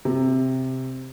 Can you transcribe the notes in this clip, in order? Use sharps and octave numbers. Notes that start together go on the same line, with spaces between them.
C3